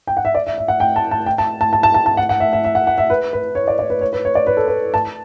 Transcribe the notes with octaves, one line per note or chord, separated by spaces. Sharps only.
G5
F#5
E5
D5
E5
E5
F#5
G5
A5
A5
G5
A5
A5
A5
A5
A5
A5
F#5
F#5
E5
E5
E5
F#5
F#5
E5
B4
B4
C#5
D5
D5
B4
C#5
B4
C#5
D5
B4
A4
B4
A5